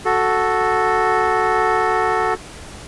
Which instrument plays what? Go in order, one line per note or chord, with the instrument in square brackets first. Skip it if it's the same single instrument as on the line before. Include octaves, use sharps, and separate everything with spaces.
[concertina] F#4 A4